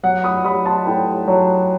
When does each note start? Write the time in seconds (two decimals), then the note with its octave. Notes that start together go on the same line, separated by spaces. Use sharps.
0.03 F#3 F#5
0.24 B5 D#6
0.44 F#3 B5 D#6
0.66 A5 C6
0.86 A2 G5 B5
1.28 F#3